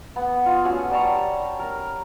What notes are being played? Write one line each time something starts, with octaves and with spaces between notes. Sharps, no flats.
B3
F4
C#4 F#4 G#4 A4
G3 A5 A#5 C#6
A#4